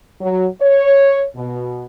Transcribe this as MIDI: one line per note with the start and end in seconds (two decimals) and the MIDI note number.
0.21 0.46 54
0.60 1.24 73
1.35 1.83 47